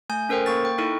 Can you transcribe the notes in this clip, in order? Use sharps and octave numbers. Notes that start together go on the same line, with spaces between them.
A3 G#5 G6
C#4 A4 A#4 C5 G5
A#3 C#6 A6
G5
D#4 E4 A4 C#6